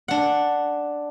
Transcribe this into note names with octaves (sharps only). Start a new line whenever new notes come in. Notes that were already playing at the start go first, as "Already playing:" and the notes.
D4 F#5